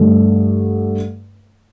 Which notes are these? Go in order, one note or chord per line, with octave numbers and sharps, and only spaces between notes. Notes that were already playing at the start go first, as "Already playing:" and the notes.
Already playing: G2 D3 A3